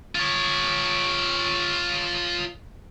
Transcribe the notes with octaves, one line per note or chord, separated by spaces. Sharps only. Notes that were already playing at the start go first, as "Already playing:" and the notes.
F4 C#5